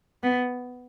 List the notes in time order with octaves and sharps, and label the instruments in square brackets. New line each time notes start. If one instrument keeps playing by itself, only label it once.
[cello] B3